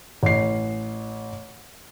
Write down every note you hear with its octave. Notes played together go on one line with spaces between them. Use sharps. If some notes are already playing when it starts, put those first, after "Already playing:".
A1 C7